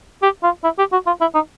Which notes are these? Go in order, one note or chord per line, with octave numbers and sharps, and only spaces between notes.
G4
F4
E4
G4
F#4
F4
E4
D#4